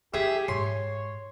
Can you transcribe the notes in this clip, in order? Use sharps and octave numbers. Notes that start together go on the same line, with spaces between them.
E4 G4 G#4 E5
G#2 C#5 C6